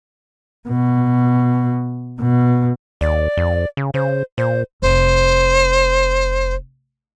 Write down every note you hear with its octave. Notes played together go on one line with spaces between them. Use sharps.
B2
B2
D#2 D5
F2
C#3
C#3 C5
A#2 C5
F1 C5